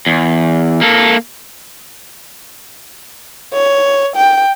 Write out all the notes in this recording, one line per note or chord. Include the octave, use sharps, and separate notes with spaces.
E2
A#3 A4
C#5
G5